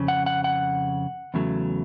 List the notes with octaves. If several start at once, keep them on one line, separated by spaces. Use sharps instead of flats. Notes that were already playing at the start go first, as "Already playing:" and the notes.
Already playing: F2 C#3
F#5
F#5
F#5
E2 C#3 F#3 A3